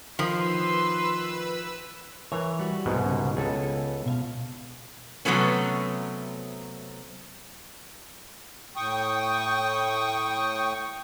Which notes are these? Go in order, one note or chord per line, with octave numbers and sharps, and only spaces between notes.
D#3 F3 B4 C6 E6
E3 A#4 C#5
G3 F#4
C2 G#2 B2
C#3
C#2 B3 G#4 A4
B2 E5 F5
C3 F#3 A3 B3 C#4
A2 G5 C#6 D#6